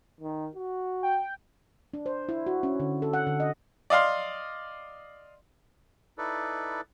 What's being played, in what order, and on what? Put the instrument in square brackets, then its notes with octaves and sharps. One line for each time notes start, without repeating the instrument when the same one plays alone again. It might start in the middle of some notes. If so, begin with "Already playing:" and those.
[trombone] D#3
F#4
[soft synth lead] G5
[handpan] D4
C5
E4
F#4
C#4
D3
A4
F#5
D3
D#5
[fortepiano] D5 D#5 F5 C6
[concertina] D#4 E4 A4 B4 D5